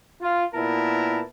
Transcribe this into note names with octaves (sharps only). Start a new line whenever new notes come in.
F4
A#2 B3 E4 A#4 A5